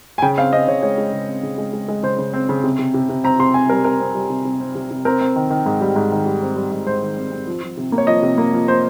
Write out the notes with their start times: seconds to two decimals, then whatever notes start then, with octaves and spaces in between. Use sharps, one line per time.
0.18 G#5
0.22 C#3 G5
0.37 C4 F5
0.52 C4 D#5
0.68 C#3 C#5
0.83 G#3 C#5
0.98 G#3
1.12 C#3
1.28 C4
1.43 C#3
1.58 G#3
1.73 G#3
1.88 G#3
2.03 C#3 C5
2.18 C#3
2.33 C4
2.49 C#3
2.63 C3
2.79 C3
2.94 C3
3.09 C3
3.24 C4 A#5
3.39 C3 C6
3.54 C4 G#5
3.69 G3 A#4
3.84 C4 A#4
4.00 C4
4.15 G3
4.30 C3
4.45 C3
4.60 C4
4.75 C3
4.91 C3
5.05 C4 A#4
5.21 C4
5.36 D#3
5.50 D#3
5.66 G#2
5.81 G3
5.96 G#2
6.11 D#3
6.26 G3
6.42 C4
6.56 G3
6.72 G#2
6.87 G#2 C5
7.02 D#3
7.17 C4
7.32 C4
7.47 F3
7.62 F3
7.77 C3
7.92 A#3
7.98 C#5
8.07 F3 D#5
8.22 C3
8.38 A#3
8.53 F3
8.68 C5